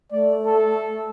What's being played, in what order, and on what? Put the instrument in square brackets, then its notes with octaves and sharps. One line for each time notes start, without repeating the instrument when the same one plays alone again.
[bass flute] A3 [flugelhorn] D5
[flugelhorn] A4